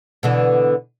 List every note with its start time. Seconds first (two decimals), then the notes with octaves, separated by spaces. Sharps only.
0.23 B2 D3 E3